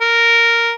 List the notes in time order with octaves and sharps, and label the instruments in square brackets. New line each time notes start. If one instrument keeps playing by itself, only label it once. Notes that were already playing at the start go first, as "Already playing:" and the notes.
[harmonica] A#4